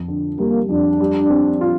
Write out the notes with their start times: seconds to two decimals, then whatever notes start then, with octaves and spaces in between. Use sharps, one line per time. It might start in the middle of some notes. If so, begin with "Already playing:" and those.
Already playing: F2
0.08 D3
0.38 G3 A#3
0.69 F2 D4
1.00 G3
1.30 C4
1.61 F4